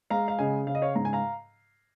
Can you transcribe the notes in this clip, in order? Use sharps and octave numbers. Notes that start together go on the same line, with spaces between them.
G#3 F5 A#5
F5
C#3 D#5 G#5
C#3 F5
D#5
C#5 F5
G#2 A#5
G#5
F5 A#5